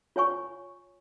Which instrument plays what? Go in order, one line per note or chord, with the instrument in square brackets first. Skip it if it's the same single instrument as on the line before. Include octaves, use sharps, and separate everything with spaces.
[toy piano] F4 C#5 G#5 C#6